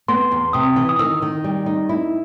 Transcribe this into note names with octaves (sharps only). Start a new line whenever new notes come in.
B3 C6
E2
C3 D#6
E3
D#6
D#3 E6
D#3
G3
D#4
E4